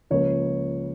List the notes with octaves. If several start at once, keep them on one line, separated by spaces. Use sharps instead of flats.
C#2 C#3 F3 A#3 C#5